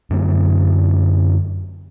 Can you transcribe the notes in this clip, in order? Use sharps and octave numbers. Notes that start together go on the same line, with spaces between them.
F#2 D3 A3 C4